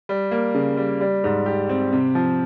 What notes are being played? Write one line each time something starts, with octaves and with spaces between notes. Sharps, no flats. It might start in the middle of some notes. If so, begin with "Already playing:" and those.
G3
A#3
C#3
G3
G3
G#2
G4
C4
C3
F3